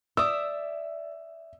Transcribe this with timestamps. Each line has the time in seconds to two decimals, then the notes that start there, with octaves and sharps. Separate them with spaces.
0.17 D5 E5 D#6 E6